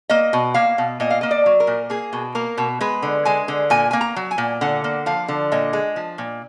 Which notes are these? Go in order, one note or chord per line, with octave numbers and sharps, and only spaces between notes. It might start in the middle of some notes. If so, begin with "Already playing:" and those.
A#3 D#5
B2
A#3 F5
B2
A#2 D#5
F5
A#3 D#5
D5
F#3
A#4
A#2
A#3 G#4
B2
A#3 A#4
B2
G#3 B4
D3
G#3 G#5
D3
A#2 G#5
A#3 G#5
A#5
F#3
G#5
A#2
D3 F#5
A#3
F3 F5
D3
A#2 D#5
G#3
F3
A#2